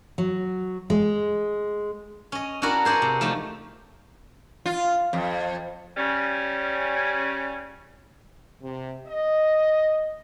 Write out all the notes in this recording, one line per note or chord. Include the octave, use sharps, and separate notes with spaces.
F#3
G#3
C#4 D#5
C#4 D4 E4 F#4 A#4 D5
G#4 C5 D5 F#5 G#5
C3
F3 A3 A#3 D#4
F4
F2
C#3 G3 C#4
C3
D#5